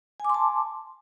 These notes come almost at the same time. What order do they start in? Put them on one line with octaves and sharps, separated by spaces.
G#5 D6 C6 A5